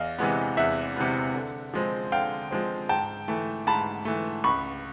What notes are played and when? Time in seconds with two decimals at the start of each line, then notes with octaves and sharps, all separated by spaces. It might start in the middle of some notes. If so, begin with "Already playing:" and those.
Already playing: E2 D#5 F5
0.18 C3 E3 G#3 B3
0.57 E2 E5 F#5
0.96 C3 E3 G#3 B3
1.34 D3
1.74 F3 G#3 C4
2.12 D3 F5 G5
2.51 F3 G#3 C4
2.89 G#2 G5 A5
3.28 E3 A3
3.67 G#2 A5 B5
4.05 E3 A3
4.44 C#2 B5 C#6